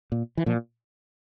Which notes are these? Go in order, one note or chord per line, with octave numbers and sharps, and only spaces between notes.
A#2
E3
A#2 F3